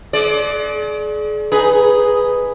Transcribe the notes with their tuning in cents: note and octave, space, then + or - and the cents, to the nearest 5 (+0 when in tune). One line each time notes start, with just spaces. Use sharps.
G#3 +40 D5 +0
D#4 +0 G#4 +0 B4 +0